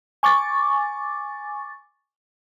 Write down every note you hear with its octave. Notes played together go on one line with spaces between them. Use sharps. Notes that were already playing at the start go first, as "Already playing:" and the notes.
G#5 C#6 D6 A6